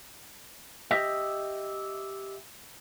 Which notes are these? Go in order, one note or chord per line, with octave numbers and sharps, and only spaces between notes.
G4 D#5 E5